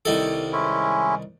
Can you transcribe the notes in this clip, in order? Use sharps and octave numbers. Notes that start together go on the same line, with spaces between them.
C2 D#3 A4
G#3 C#4 E4